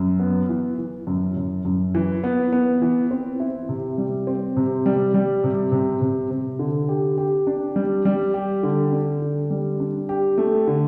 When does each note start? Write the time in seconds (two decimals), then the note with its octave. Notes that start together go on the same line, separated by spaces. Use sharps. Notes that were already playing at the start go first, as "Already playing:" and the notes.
Already playing: F#2
0.20 B3
0.49 E3
0.78 E3
1.07 F#2
1.37 F#2
1.65 F#2
1.95 E3
2.24 B3
2.52 B3
2.82 E3
3.11 C4
3.40 E4
3.69 C3
3.98 G3
4.27 C4
4.57 C3
4.86 G3
5.14 G3
5.44 C3
5.72 C3
6.02 C3
6.31 C3
6.59 D3
6.89 G4
7.18 G4
7.47 D4
7.76 G3
8.05 G3
8.34 G4
8.63 D3
8.92 D4
9.22 D3
9.50 G3
9.80 D4
10.09 G4
10.38 A3
10.67 D3